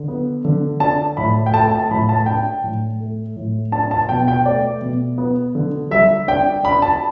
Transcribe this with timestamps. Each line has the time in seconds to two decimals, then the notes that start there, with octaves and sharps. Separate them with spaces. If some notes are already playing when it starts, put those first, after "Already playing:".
Already playing: D3
0.08 B3
0.45 D3
0.80 D4 A5
1.17 A2 B5
1.46 G5
1.53 A3 A5
1.71 A5
1.83 A5
1.91 A2 B5
2.09 A5
2.26 D4 G5
2.64 A2
3.00 A3
3.36 A2
3.72 D4 A5
3.91 A5
4.09 B2 G5
4.28 G5
4.45 A3 D5
4.81 B2
5.18 B3
5.55 D3
5.91 G3 E5
6.28 D4 G5
6.64 D4 B5
6.82 A5